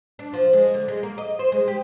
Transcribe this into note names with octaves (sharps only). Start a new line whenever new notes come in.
D4
F3
G#3
D3
G#3
A#3
D#5
C5
G#3
G4